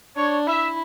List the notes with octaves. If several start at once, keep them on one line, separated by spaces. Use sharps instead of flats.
D4 C#5
E4 E5